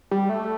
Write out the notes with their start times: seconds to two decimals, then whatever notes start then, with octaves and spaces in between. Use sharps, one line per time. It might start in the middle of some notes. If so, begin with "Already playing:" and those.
0.11 G3
0.29 A3